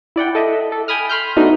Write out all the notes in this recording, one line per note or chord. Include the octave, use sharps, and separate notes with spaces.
E4 D5 F#5 G5
A4 D#5 E5
A4
G5 G#5 B5 D#6 F6
B5 C6 F6 G6
A3 B3 D4 D#4 F#4